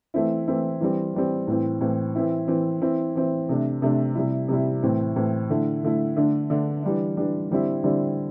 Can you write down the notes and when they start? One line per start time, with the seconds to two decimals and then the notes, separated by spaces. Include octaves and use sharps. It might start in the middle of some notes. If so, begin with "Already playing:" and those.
0.14 E3 A3 C4 E4
0.48 E3 A3 C4 E4
0.80 E3 G3 C4
1.14 E3 G3 C4
1.47 A2 E3 C4
1.81 A2 E3 C4
2.15 E3 C4 E4
2.48 E3 C4 E4
2.81 E3 C4 E4
3.15 E3 C4 E4
3.49 C3 A3 D4
3.82 C3 A3 D4
4.15 C3 G3 E4
4.48 C3 G3 E4
4.83 A2 E3 C4
5.16 A2 E3 C4
5.50 D3 A3 E4
5.83 D3 A3 E4
6.16 D3 A3 D4
6.50 D3 A3 D4
6.83 E3 G3 D4
7.17 E3 G3 D4
7.50 D3 G3 C4 E4
7.84 D3 G3 C4 E4